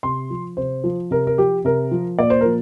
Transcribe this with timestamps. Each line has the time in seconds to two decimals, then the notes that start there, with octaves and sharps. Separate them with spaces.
0.03 C3 C6
0.30 F3
0.57 C3 C5
0.84 F3
1.11 C3 A#4
1.27 A#4
1.38 F3 G4
1.65 C3 A#4
1.91 F3
2.19 A#2 D5
2.30 C5
2.41 F3 A#4